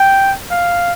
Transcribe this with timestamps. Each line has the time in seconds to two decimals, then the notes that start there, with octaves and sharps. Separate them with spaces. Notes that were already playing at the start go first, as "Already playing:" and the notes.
Already playing: G5
0.51 F5